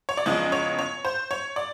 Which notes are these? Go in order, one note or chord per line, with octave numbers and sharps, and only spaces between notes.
C#5
D5
E2 C#3 F3 G#3 D#5
C#5
C#5
C5
C#5
D5